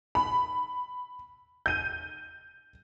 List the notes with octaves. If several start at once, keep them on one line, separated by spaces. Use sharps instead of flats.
B5
G6 D#7